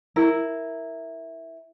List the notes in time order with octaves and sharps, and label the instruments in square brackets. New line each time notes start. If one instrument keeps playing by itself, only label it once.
[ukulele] E4 A#4